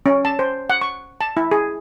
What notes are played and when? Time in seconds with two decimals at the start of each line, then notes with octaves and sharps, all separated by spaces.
0.06 C#4
0.25 A5
0.39 C5
0.70 F#5
0.81 C#6
1.21 A5
1.37 E4
1.51 G#4